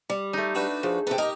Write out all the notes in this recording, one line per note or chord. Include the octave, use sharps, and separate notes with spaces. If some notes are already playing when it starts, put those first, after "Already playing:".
G3
A3 D#4
D4 F#4 B4
F3 G#4
C3 A4 B4 G5
D#4 G4 A#4 D#5